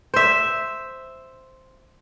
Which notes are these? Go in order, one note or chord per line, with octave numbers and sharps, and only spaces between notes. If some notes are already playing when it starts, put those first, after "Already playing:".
C5 E5